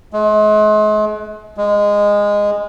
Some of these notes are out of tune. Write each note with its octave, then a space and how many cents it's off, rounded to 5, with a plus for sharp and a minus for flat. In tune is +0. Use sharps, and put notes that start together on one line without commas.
G#3 +40
G#3 -15